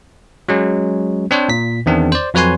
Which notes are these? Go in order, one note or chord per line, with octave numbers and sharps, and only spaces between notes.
F#3 G#3 C#4
C4 D4 C5 C#5
A#2 B6
E2 D#3 C4 D4
C5 D5
F2 F#3 B4 C#5 G#5 C6